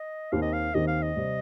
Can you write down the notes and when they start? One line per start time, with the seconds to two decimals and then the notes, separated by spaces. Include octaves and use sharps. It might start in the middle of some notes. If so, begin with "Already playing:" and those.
Already playing: D#5
0.32 D#2 D#3 C4 G4 F5
0.42 D#5
0.53 F5
0.74 D#2 D#3 C4 G4 D#5
0.88 F5
1.02 D#5
1.16 C3 G3